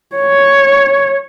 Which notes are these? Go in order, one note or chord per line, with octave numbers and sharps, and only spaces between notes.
C#5